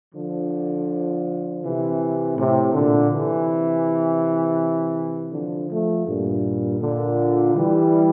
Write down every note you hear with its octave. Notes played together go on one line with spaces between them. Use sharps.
D3 F3
C3 E3
A2 C3
A#2 D3
C3 E3
D3 F3
F3 A3
G2 A#2
A#2 D3
E3 G3